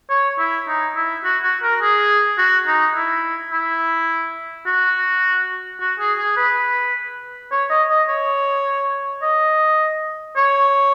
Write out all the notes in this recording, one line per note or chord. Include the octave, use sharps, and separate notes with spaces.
C#5
E4
D#4
E4
F#4
F#4
A#4
G#4
F#4
D#4
E4
E4
F#4
F#4
G#4
G#4
B4
C#5
D#5
D#5
C#5
D#5
C#5